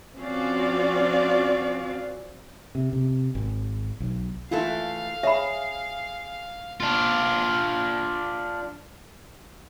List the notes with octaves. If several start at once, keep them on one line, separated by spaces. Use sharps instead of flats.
F3 C4 C#4 F#4 D5 F5
C3
C3
G#1
B1
E3 A3 F4 A4 F5
G#4 C#5 E5 B5
D4 F4